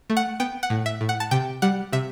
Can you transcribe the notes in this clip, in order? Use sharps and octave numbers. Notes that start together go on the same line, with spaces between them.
A3
F#5
B3 G5
F#5
A2
E5
A2
F#5
A5
C3 G5
G3 F#5
C3 E5